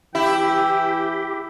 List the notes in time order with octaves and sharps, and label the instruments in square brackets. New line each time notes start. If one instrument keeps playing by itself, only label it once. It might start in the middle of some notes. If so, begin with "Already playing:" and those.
[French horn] E3 [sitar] E4 [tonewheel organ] G4 [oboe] G5